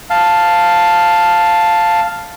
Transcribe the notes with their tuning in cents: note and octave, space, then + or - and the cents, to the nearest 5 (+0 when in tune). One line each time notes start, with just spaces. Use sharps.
F5 +0 A5 +0